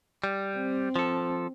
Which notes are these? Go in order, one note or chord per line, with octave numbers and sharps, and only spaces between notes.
G3
C4
F3 A4